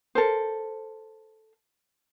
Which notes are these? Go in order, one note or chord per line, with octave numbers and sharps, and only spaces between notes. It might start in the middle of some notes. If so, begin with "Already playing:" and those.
A4 A#4 C5